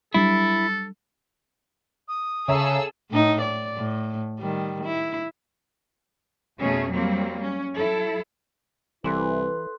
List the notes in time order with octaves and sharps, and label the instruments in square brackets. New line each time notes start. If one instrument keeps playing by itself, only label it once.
[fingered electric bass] F#3 G3 D4 [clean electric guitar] E4 [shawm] A4
[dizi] D#6
[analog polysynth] C#3 [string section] G#4 A4 E6 [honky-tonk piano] C#5 E5 A#5
[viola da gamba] A2 D#4
D5
A2
D#3 G3
E4
[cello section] F2 B2 A3 C#4 G#4
F#3 G3 A#3 C4
C#4
F#3 E4 A4
[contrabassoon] C2 [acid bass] E3 [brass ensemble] E4 B4 [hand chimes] A4 C6 F#6